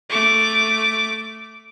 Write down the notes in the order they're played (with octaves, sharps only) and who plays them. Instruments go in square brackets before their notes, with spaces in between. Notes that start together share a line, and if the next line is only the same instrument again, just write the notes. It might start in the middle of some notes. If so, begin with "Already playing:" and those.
[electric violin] A3 D6